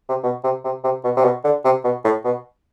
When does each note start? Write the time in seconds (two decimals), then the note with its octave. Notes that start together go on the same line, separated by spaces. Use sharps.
0.09 C3
0.24 B2
0.44 C3
0.64 C3
0.84 C3
1.04 B2
1.17 C3
1.24 B2
1.44 D3
1.65 C3
1.84 B2
2.04 A2
2.25 B2